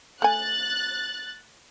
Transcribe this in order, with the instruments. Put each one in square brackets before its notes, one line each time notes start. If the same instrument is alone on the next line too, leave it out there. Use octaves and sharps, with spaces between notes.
[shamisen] A3 G#5 [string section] F#6 A6